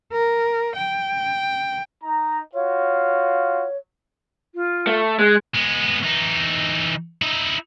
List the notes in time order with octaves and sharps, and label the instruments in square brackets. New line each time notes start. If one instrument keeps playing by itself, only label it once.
[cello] A#4
G5
[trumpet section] D#4 A#5
[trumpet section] F4 F#4 F5 [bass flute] C#5
[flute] F4
[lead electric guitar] A3
[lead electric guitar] G#3 [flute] F#6
[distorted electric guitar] G#3 B3
E3 D#4
D#4 E4